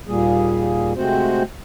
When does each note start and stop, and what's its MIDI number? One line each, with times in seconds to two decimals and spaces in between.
0.07 0.93 39
0.07 0.93 46
0.07 0.93 55
0.07 0.93 58
0.07 0.93 68
0.96 1.43 48
0.96 1.43 56
0.96 1.43 57
0.96 1.43 60
0.96 1.43 66
0.96 1.43 72